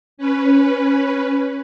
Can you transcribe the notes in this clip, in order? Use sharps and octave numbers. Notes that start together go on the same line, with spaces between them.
C#4 B4